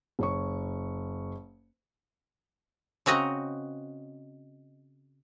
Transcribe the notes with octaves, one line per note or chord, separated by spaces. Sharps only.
F#1 C#5 C#6
C#3 C4 F#4 D#5 A#5